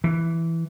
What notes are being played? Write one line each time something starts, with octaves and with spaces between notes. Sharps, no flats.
E3